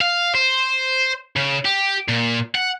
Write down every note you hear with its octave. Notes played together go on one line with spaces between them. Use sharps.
F5
C5
C#3
G4
A#2
F#5